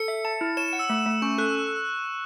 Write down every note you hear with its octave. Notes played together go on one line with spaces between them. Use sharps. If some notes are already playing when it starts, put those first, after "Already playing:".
Already playing: A4 C#7
E5
A5
E4
C#5 E7
F#5 E7
E6
A3
A3
C#4 C#6
A4 F#6